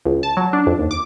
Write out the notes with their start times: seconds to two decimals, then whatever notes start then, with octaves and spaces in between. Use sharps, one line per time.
0.05 C#2
0.23 A5
0.37 F#3
0.53 D4
0.67 F2
0.79 D#2
0.91 D6